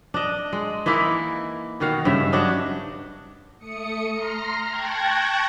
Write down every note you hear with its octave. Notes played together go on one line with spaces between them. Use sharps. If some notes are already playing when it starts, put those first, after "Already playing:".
D4 D#5
G#3
E3 A#3 D#4 E4
B2 D#3 F#4 F5
G2 C#3 E5
F#3 D4 D#4
A3 D#6 C#7
A#5 C6 F6
G5 A5 C#6 F#6 G#6 A#6